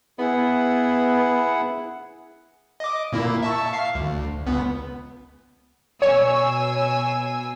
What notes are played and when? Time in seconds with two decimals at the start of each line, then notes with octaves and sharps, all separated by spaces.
0.19 B3 E4 G#4 F#5
2.80 D#5 D6
3.13 A#2 A#3 E4
3.43 E5 A5 C#6
3.73 F5 C7
3.95 D2
4.46 C#2 B3
6.02 B2 C#5 G#5 E6